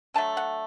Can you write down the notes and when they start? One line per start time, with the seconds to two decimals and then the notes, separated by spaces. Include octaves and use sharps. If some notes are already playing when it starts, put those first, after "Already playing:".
0.14 D3 F#3 A3 A5
0.37 F#5